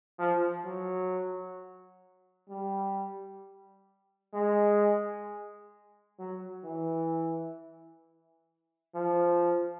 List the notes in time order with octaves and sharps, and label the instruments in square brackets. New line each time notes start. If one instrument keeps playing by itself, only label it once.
[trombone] F3
F#3
G3
G#3
F#3
E3
F3